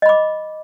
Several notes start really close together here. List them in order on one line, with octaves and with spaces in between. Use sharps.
D#5 B5 D6